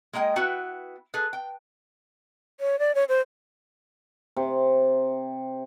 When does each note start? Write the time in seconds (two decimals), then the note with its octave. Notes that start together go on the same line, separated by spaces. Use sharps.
0.13 G#3 A#3 D#5 G5
0.36 B3 E4 F#4 B4 F#5 G5
1.14 G#4 A4 B4
1.33 G5
2.60 C#5
2.79 D5
2.95 C#5
3.09 C5
4.37 C3